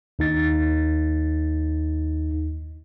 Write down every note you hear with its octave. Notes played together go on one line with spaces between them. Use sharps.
D#2 D#4 A6